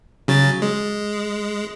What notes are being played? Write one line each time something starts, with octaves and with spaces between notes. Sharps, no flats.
C#3 F#3 A6
G#3